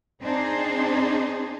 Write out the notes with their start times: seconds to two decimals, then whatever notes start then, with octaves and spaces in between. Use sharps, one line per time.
0.22 C4 D4 D#4 G#4 C5